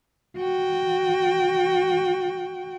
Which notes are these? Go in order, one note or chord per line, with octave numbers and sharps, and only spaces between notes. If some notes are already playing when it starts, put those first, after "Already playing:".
F#4 G5